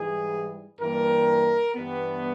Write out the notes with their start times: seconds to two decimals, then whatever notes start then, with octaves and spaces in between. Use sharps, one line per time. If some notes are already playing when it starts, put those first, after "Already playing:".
Already playing: G#2 E3 G3 G#4
0.79 G2 E3 G3 A#3 A#4
1.75 G2 E3 G3 B3